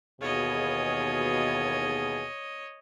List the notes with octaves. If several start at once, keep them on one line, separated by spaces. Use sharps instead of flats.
D#2 B2 E3 F4 G#4 C#5 D#5